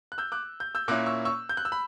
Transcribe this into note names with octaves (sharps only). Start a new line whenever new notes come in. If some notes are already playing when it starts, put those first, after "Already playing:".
F#6
E6 G6
D6 F#6
G6
E6 G6
A#2 A#3 C#4 E4 D6 F#6
C#6 E6
C#6 E6
G6
F#6
E6
B5